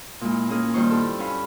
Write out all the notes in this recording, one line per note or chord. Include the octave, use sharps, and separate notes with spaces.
A#2 G#3 E4
A#3 C#4 G#4 A#4
G2 A#2 D#3 C5 C#6
E4 G4 A4
C#4 F5 B5